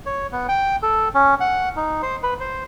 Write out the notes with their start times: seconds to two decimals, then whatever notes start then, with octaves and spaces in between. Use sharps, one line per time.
0.06 C#5
0.32 B3
0.49 G5
0.83 A4
1.14 C#4
1.40 F#5
1.76 D#4
2.02 C5
2.23 B4
2.40 C5